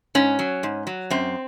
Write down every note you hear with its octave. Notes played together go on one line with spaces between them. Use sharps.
G#2 C#4
F#3
G#2
F#3
F#2 C4